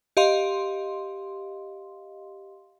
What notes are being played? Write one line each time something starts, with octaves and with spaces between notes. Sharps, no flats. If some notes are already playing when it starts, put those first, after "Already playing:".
G4 D#5 F5 C6